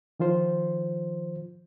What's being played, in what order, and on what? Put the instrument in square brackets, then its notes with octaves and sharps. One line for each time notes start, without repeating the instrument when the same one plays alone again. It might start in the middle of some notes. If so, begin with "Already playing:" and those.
[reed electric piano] D#3 F3 F4 C5